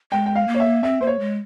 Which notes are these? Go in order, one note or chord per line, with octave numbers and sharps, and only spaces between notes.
G#3 G5
G5
F5
A#3
C#5
E5
C4 E5
A#3 C5
C#5
G#3